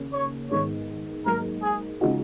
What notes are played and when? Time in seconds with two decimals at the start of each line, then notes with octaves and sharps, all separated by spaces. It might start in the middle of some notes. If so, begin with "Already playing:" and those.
Already playing: D#2 C#3 A#3 C#4
0.13 C#5
0.50 G#1 G#2 D#3 G#3 B3 C#5
1.26 G#2 F#3 A#3 A#4
1.63 G#4
2.01 C#3 F3 G#3 D#4 F#4